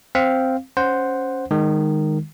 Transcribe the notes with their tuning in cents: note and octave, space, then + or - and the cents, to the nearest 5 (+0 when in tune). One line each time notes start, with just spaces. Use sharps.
C4 +0 F5 +0
C#4 +0 C5 +0 F#5 +0
D#3 -15 G#3 -20